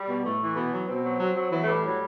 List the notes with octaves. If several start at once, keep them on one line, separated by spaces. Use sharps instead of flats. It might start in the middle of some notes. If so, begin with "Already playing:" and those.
Already playing: G3
B2
A2 A3
E3
B2 B3
F#3
B2 C4
F#3
F#3
F#3
E3 B3
A3
A2 G3
F#3